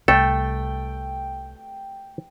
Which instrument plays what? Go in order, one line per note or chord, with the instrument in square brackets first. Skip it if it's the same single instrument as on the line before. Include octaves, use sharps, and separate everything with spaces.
[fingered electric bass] C2 [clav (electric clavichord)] A3 A4 [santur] G5